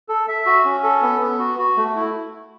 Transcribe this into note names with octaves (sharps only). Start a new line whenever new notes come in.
A4
E5
F#4
C#4
A4
B3
B3
F#4
F#4
A3
E4